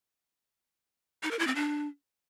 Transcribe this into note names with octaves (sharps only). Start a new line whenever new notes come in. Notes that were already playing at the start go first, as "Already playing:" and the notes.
D#4
A#4
E4
C4
D4